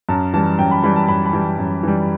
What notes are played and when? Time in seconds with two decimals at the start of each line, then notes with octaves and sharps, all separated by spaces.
0.09 F#2 A5
0.33 E3 G3 A5
0.59 F#2 G5
0.71 B5
0.84 E3 G3 B5
0.96 A5
1.08 F#2 B5
1.26 B5
1.33 E3 G3
1.59 F#2
1.83 E3 G3